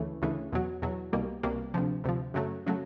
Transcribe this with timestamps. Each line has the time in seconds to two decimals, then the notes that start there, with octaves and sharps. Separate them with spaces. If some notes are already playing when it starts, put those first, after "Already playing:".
Already playing: D2 C#3 E3 A3
0.22 D2 C#3 E3 A3
0.53 E2 B2 F#3
0.82 E2 B2 F#3
1.13 C2 B2 G3 A#3
1.43 C2 B2 G3 A#3
1.74 D2 C3 F3
2.04 D2 C3 F3
2.34 F#2 C#3 F#3 A3
2.67 C#3 F#3 A3